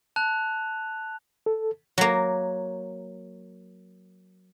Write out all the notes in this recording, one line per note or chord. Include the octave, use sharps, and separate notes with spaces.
A5 F#6 F7
A4
F#3 A#3